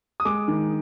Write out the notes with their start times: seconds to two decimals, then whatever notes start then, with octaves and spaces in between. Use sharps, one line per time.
0.20 D#6
0.25 G#3 D6
0.48 D#3